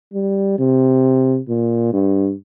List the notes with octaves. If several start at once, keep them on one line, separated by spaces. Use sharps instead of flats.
G3
C3
A#2
G2